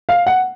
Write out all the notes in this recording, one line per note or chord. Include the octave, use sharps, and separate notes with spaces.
F5
F#5